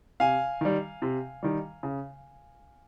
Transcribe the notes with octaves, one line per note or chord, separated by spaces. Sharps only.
C3 F5 G#5
D#3 G3
C3
D#3 G3
C#3